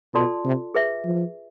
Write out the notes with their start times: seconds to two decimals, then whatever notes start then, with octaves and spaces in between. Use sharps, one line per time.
0.14 B2 F4 A4 D5 A5 C6
0.44 C3
0.74 G#4 B4 E5
1.05 F3